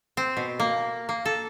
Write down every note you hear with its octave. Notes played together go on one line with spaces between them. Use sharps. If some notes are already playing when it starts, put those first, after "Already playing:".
C4
B2
A#3
A#3
A4